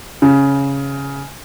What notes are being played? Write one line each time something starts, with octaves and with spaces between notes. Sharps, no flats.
C#3